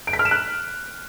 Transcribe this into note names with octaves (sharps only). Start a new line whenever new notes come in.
D7
B6
F6
E7
F#6